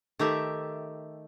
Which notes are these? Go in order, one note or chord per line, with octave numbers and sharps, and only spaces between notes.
D#3 A3 G4 E5